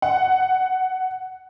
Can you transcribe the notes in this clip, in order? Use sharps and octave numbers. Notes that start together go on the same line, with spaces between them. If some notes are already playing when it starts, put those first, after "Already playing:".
F#5